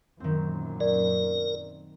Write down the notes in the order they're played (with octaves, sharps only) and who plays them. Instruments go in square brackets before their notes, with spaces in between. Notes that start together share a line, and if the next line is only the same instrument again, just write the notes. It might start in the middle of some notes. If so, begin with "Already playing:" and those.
[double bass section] F#2 A#2 [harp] D#3 C4
[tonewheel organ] A#4 [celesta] D5